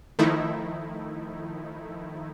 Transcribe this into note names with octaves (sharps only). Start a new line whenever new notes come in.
D#3 F3 A3 D#4 E4